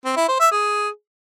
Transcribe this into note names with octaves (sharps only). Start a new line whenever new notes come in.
C4
E4
C5
E5
G#4